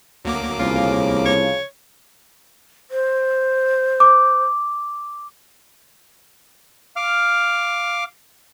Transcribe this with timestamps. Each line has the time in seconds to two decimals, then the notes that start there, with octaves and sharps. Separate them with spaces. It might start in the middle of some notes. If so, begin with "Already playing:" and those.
0.25 D2 F#3 A#3 D6
0.59 C2 C#3 F3 F4
1.25 C#5
2.91 C5
4.00 D6
6.96 F5 D6 F6